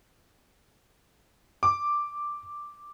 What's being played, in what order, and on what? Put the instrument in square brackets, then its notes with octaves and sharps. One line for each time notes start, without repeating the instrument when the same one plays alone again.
[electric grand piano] D6